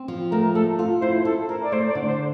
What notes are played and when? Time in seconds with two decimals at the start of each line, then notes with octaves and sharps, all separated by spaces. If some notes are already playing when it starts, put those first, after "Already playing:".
Already playing: C4
0.08 F3
0.32 A3 A#4
0.55 A3 A4
0.79 F4
1.02 E4 C5
1.25 E4 A4
1.49 E4 A#4
1.63 D5
1.72 A3 C5
1.89 D5
1.95 D3
2.08 C5